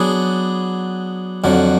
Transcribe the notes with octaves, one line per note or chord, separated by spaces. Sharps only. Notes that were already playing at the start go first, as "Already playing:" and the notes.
Already playing: F#3 B3 D4 G#4
F2 D3 F#3